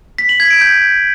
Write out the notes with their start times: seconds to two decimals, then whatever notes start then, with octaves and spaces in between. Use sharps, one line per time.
0.18 B6
0.29 F#7
0.40 G#6
0.50 D7
0.61 G6